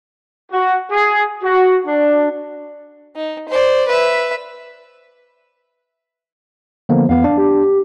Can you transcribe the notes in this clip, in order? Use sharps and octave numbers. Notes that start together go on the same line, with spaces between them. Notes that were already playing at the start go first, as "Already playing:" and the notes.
F#4
G#4
F#4
D4
D#4
C5 D5
B4 E5
D3 F3 A#3 B3
E2 B3 F5
D4
G4